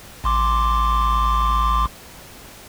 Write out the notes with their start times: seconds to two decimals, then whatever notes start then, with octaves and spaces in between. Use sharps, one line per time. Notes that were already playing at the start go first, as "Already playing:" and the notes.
0.24 A1 C6 D6